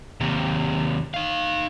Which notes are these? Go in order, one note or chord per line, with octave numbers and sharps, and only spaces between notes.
D#2 C3
D#4 F5